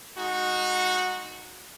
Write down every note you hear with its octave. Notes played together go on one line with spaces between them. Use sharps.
G#3 D#4 F#4